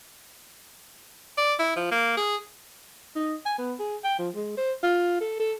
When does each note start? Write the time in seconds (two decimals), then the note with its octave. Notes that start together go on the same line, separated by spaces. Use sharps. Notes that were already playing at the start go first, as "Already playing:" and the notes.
1.38 D5
1.59 E4
1.76 F3
1.92 A#3
2.17 G#4
3.16 D#4
3.46 G#5
3.58 B3
3.79 G#4
4.04 G5
4.19 F3
4.35 G#3
4.57 C5
4.83 F4
5.21 A4
5.39 A4